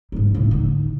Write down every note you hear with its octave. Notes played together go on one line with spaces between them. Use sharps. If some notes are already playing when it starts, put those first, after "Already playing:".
G#2 G3
A2 A#3
D3 D#4